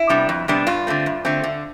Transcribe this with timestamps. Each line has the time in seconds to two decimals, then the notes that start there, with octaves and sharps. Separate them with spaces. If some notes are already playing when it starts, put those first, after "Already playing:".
Already playing: E4
0.09 C3 G3 B3 D4
0.29 F2
0.48 C3 G3 B3 D4
0.67 G2 F4
0.87 D3 A3 C4
1.06 G2
1.25 D3 A3 C4
1.44 D3